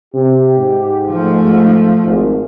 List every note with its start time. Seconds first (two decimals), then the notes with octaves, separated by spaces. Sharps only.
0.15 C3 G4
0.59 G#2
1.10 F3 A3
2.05 G#1 G#2